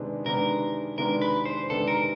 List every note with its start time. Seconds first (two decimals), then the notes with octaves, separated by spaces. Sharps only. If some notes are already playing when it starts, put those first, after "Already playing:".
Already playing: C3 D#3 G#3 B3 D4
0.26 C3 D#3 G#3 B3 D4 A#4
0.98 C3 D#3 G#3 B3 D4 A#4
1.22 B4
1.45 C5
1.70 C3 D#3 G#3 B3 D4 A4
1.88 A#4